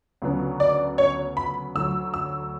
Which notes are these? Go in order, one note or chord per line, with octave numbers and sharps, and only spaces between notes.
D2 C#3 F#3 B3 D4
D5
C#5
B5
D2 D3 F#3 E6
E6